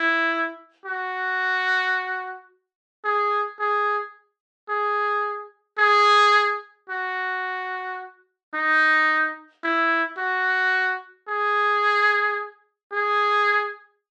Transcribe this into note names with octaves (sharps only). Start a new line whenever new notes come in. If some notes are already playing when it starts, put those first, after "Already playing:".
Already playing: E4
F#4
G#4
G#4
G#4
G#4
F#4
D#4
E4
F#4
G#4
G#4